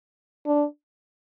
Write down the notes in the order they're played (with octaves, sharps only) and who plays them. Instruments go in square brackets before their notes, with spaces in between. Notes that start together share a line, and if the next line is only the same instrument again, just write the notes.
[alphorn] D4